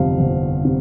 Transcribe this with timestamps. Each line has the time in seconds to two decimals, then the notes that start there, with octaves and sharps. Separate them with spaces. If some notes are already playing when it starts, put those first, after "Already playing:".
Already playing: G1 F2 C3 G3 C4 F5
0.20 G1
0.64 C3 G3 C4